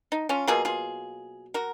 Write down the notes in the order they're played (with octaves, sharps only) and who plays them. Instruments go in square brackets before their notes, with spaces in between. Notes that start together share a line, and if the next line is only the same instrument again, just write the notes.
[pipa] D#4
C#4 F4
B2 F#3 A#3 F4 G#4
F4 G#4
F#4 A#4